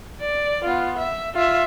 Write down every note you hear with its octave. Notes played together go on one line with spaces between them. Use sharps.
D5
B3 F4
E5
F4 E5